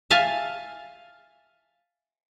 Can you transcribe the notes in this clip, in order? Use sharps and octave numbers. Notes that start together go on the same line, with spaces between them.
E5 F5 G#5 A5